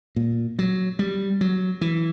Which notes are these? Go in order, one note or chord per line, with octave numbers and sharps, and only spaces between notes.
A#2
F#3
G3
F#3
E3